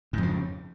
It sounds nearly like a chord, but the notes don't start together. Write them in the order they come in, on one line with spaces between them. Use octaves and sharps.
G#2 F2 C#3